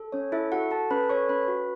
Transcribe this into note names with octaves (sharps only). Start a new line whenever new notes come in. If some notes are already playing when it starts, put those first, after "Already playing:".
Already playing: A4
C#4 C#5
E4 A4 E5
F#4 A4 F#5
A4 A5
C#4 B4 B5
A4 C#5 C#6
C#4 B4 B5
F#4